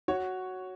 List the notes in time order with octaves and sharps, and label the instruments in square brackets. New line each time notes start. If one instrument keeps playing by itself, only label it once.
[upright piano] F#4 [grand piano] C#5